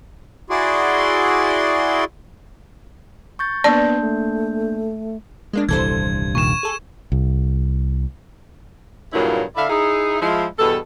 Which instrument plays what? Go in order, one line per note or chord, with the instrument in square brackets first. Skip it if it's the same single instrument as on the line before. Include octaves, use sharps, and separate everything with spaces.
[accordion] E4 F#4 G#4 D5 C6
[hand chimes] C#6 G6 A6
[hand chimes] A#3 D4 G6 [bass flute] B3 [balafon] D5 [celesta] A5
[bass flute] A3
[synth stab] G#3 A#3 D4
[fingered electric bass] D#1 C2 G2 [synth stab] E3 A4 C5 [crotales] G#6
[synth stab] A#2 D#3 [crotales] C#6 E7
[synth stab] G#4 A4
[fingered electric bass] C2
[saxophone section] G2 A#2 C#3 F#3 A#3 E4
D3 E4 D5 E5 F5
D#4 E4 G#4
F3 G#3 E4
E2 G2 B2 A4